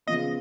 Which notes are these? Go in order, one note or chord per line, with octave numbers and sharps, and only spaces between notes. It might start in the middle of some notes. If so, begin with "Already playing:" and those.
C#3 F3 B3 F4 D#5